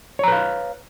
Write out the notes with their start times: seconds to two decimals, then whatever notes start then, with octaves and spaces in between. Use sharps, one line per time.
0.19 C#5
0.24 A#5
0.28 B4
0.32 F5